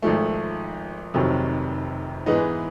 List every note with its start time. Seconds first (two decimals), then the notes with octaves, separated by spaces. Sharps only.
0.02 G#1 G#2 F3 A3
1.14 F1 F2 C3 D#3 F#3
2.26 G#2 E3 G#3 B3 D#4